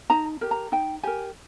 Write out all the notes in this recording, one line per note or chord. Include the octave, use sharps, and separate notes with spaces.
D#4 A#5
G4 A#4
A#5
D#4 G5
G4 A#4 G#5